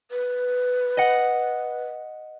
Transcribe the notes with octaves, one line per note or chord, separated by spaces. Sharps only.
B4
D#5 F#5